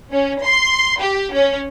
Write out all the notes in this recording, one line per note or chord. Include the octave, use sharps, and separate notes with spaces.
C#4
C6
G4
C#4